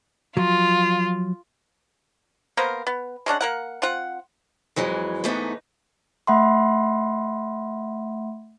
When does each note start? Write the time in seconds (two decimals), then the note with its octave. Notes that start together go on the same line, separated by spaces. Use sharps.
0.37 F3 F#3 F4
2.57 A#3 B3 A#4 C5
2.87 B3
3.26 G#3 C#4 D4 F#5
3.41 A#3 A#4 F#5
3.82 C4 F4 F#5
4.76 F2 E3 F#3 G#3
5.24 G#2 E3 A3 B3 D#4
6.27 A3 E5 F#5 B5 C6